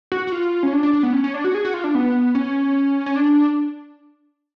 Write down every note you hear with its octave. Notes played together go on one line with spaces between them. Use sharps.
F#4
F#4
F4
C#4
D4
D4
D4
B3
C#4
C#4
D4
F#4
G#4
F#4
F4
D4
B3
C#4
C#4
D4